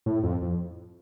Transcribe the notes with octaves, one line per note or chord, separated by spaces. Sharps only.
A2
F2
F2